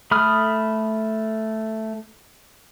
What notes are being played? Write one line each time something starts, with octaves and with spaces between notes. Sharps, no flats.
A3 B5 D#6 F6